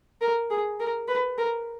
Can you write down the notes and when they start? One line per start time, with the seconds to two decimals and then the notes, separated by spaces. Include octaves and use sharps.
0.21 A#4
0.50 G#4
0.80 A#4
1.08 B4
1.38 A#4